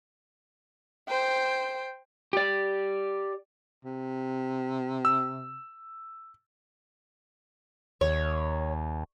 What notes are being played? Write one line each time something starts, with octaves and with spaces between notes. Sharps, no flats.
C5 G5
G4 D5
C3
E6
D#2 C#5